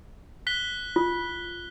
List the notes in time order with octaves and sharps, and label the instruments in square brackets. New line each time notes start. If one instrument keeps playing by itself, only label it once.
[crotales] F#6 B6 G7
[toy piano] F4